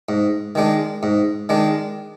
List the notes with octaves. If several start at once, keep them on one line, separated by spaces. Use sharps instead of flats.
G#2
D#3 G#3 D4
G#2
D#3 G#3 D4